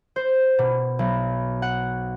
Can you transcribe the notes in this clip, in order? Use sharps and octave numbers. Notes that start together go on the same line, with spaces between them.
C5
B2
B1
F#5